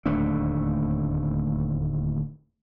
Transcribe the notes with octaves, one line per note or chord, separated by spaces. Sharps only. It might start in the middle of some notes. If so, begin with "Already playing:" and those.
D1 D#2 A3 D4